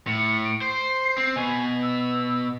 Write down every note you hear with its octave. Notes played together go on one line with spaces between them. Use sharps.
A2 C#7
D7
C5 C7
C4
B2 G#5
E6